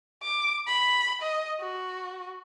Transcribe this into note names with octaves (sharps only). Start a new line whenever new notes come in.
D6
B5
D#5
F#4